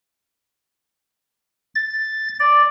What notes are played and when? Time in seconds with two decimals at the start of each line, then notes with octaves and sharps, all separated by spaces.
1.75 A6
2.40 D5